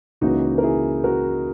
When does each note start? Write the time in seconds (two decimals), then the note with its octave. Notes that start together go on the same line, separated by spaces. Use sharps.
0.21 C#2 C#3 E3 A#3 D#4 F#4
0.58 A#4
0.63 E4 G#4
1.04 F#4 A#4